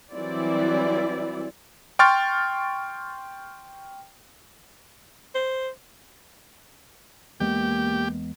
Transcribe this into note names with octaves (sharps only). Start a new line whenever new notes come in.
E3 F#3 G3 C4 E4 D5
G5 C6 C#6 F6 A6
C5
E2 G#3 A#3 B3 G4